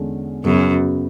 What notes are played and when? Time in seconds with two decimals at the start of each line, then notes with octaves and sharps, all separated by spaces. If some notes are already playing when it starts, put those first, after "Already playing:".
Already playing: E2 D3 G#3 C#4
0.44 F#2 C#3 F#3 B3